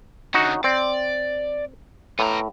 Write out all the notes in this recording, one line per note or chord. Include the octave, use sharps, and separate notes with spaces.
D3 C#4 D#4 F#4
C4 D5
A2 B3 A#5